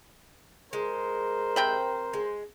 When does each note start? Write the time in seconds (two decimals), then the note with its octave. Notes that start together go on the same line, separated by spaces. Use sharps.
0.73 G#3 A#4 C5
1.56 C3 G5 B5
2.13 G#3